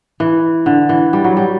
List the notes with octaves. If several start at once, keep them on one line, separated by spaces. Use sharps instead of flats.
E3
D3
E3
G3
F#3
G3